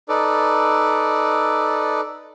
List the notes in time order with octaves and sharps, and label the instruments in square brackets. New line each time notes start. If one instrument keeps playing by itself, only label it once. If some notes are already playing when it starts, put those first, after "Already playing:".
[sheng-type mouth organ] D#4 A4 B4 D5